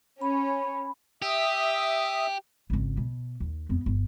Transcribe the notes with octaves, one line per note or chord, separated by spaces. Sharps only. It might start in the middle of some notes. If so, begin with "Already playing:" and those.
C#4 B5
G4 E5 D#6
G#1 C#2
B2
D#2
F2 B3
G1